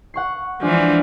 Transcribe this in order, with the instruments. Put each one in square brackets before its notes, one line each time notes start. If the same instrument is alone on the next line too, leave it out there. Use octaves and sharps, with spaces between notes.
[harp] F#5 C#6 C7
[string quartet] E3 F3 [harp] G#3 D4